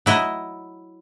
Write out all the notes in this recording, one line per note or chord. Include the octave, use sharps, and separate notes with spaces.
F#3 E4 D#5